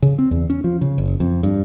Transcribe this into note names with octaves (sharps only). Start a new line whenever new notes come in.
C#3
C4
E2
C#4
F3
C#3
F#1
F2
G2